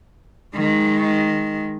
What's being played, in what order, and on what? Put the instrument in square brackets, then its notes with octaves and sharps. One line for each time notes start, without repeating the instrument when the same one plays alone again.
[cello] D#3 G#3